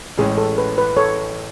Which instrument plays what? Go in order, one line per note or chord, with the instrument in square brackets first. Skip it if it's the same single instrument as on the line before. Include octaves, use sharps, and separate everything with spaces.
[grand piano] A1 A2 G#3 C#4 [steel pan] G#4
[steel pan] A4
B4
B4
A4 C#5